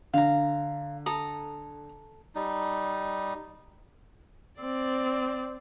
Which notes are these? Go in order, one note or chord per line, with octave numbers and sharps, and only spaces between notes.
D3 F5 A#5
A4 A#5 D#6
G3 D#4
C4 D5